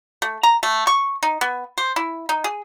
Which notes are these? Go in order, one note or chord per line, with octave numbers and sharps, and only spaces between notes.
A3
A#5
A3
C#6
D#4
B3
C5
E4
D#4
G#4